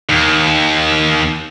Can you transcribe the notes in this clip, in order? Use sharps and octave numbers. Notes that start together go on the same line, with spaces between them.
D#2